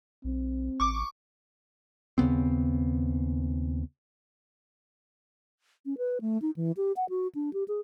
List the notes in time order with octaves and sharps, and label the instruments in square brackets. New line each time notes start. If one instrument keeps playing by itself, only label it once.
[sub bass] B1 [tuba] C4
[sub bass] A1 [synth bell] C#6 D6
[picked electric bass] D#2 C#3 B3 C4
[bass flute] C#4
B4
A3
D#4
E3
G4
F#5
F#4
D4
G4
G#4